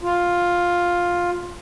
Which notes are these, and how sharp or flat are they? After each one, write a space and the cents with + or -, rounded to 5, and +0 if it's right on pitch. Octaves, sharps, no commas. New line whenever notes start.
F4 +10